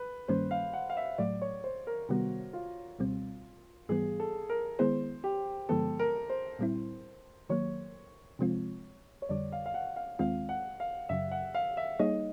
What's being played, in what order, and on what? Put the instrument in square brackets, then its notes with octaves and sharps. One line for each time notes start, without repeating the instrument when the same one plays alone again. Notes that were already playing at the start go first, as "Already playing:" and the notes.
Already playing: [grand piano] B4
[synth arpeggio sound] G2 D#3 G3 A#3 C#4 [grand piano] C5
[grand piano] F5
F#5
F5
E5
[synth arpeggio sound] A2 F#3 A3 [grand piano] D5
[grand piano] C#5
C5
A#4
[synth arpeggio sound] C3 D#3 G3 B3 [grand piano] F#4
[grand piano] F4
[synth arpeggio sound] C#2 B2 G3 C4
[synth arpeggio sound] G#2 E3 G3 B3 [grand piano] G#4
[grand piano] A4
A#4
[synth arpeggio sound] D#3 G#3 B3 E4 G#4 [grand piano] C5
[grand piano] G4
[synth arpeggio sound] G2 D3 F3 G#3 B3 [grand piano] A4
[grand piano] A#4
C5
[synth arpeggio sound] A#2 G3 C4 E4
[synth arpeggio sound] D#3 F#3 A#3 [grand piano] C#5
[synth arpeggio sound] C3 F3 G#3 C4 F4
[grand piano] C#5
[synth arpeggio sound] F2 D3 G3 [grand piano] D5
[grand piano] F5
F5
F#5
F5
[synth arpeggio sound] D#2 D#3 G#3 C4 F4 [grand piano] F5
[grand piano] F#5
F5
[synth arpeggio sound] F#2 C#3 F#3 [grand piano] E5
[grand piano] F#5
F5
E5
[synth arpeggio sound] G3 A#3 D#4 G#4 C#5 [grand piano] D#5